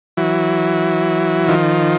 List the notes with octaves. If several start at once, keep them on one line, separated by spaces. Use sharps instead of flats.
E3 F#3
D#3 F3